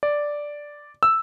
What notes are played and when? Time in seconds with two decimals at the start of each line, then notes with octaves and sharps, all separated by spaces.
0.03 D5
1.03 E6